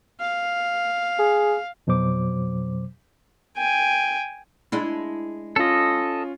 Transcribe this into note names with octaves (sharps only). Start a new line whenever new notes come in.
F5
G#4
F2 B2 F#3 C5 D6
G5 G#5
G#3 D4 E4
C#4 F4 A4 D#5